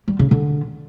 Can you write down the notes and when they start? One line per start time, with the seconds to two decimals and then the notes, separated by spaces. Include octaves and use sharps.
0.08 G3
0.19 C#3
0.31 D3